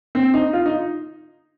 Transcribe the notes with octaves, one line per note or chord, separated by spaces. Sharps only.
C4
D#4
F4
D#4